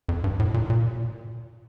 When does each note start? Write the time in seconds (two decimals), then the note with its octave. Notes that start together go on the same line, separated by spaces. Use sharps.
0.09 F2
0.24 G2
0.39 A2
0.54 A#2
0.70 A#2